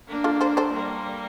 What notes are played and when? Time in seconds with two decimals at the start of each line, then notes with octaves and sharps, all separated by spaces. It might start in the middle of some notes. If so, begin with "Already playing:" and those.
0.08 A#3 D4
0.24 F4 A4
0.41 A4 C5
0.57 A4 C5
0.73 G3 A#3